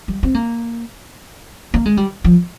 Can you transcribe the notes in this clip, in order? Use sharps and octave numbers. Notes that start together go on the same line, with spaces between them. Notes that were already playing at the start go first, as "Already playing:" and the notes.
G3
C4
A#3
A#3
G#3
G3
F3